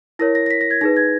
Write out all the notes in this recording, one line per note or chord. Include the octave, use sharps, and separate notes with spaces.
E4 A#4 C#5 A#6
A#6
A#6
B6
A#6
G#6
D#4 G#4 B4 A#6
G#6